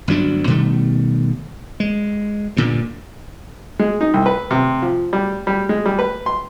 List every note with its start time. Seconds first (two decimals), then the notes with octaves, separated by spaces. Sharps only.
0.08 G1 D2 F#3 D4
0.47 B2 D#3 G3 A3
1.80 G#3
2.57 G2 A#2 D3
3.79 G#3
4.01 D#4
4.14 C2
4.26 B4
4.51 C3
4.82 F3
5.13 G3
5.47 G3
5.69 G#3
5.86 G3
5.99 B4
6.26 C6